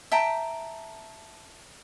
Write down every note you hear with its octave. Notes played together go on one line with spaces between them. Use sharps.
E5 G5 A5 A#5